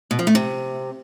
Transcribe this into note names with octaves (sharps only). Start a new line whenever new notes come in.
B2
F3
A3
C3